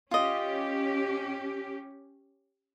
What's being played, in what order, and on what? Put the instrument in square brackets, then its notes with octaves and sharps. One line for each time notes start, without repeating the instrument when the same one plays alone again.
[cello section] C#4 G4 [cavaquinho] F4 D#5